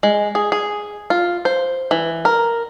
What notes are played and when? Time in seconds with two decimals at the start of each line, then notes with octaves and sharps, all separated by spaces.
0.03 G#3
0.35 G#4
0.52 G#4
1.10 F4
1.45 C5
1.91 E3
2.25 A#4